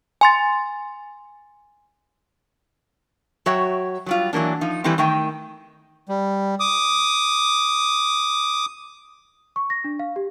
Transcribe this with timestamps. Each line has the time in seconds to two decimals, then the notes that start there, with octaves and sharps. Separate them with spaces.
0.21 G#5 C6 A6
3.46 F#3 F#4 C#5 E5 G5
4.06 F#3 G3 F4
4.33 E3 F#3 A#3 D4
4.61 F3 D#4
4.84 E3 G3 A3 C4 E4
4.98 D#3 A3 D#5 G5
6.09 G3
6.60 D6 D#6
9.56 C#6
9.70 A#6
9.84 D4
9.99 F5
10.16 G4